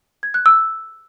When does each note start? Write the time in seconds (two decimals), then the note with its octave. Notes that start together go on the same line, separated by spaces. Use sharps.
0.23 G#6
0.34 F#6
0.46 E6